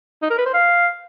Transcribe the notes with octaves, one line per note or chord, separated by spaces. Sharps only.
D#4
A#4
B4
C5
F5